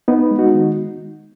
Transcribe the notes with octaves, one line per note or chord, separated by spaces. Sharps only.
B3 D#4
G#3
D#4 F#4
D#3